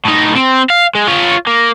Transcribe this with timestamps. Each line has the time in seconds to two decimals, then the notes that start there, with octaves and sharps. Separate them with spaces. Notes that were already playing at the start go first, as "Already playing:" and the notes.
0.05 A2 D#4
0.35 C4
0.70 F5
0.95 G#3
1.07 F4 C#5
1.47 A#3